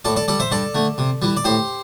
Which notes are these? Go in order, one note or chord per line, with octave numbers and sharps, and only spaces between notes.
A2 A4 D5
A4 D5
G3 A4 D5
C5 E5
G2 A4 D5
D3 A3
C3
E3 G3
D5
A2 G4 C5